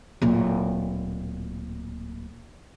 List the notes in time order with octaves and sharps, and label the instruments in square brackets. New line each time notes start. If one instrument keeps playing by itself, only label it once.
[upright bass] D1 A#2